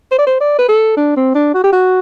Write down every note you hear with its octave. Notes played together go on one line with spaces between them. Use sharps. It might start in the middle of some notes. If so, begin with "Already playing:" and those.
C5
D5
C5
D5
B4
A4
D4
C4
D4
F#4
G4
F#4